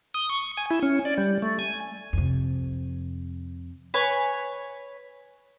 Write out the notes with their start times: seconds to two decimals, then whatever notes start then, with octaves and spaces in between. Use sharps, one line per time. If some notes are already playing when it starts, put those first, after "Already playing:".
0.14 D#6
0.29 C#6
0.57 G#5
0.71 E4
0.83 C#4
1.05 D5
1.18 G3
1.42 A3
1.59 G#5
2.13 F2 C3
3.94 B4 C#5 G#5